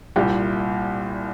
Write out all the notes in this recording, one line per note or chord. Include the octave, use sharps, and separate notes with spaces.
C2 A#2 G3 G4